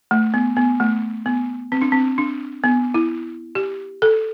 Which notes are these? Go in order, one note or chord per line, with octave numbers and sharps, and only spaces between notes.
A3
B3
B3
A3
B3
C4
D4
C4
D4
B3
E4
G4
A4